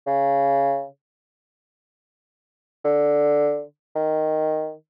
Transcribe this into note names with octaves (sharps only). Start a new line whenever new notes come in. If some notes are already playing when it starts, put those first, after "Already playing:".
C#3
D3
D#3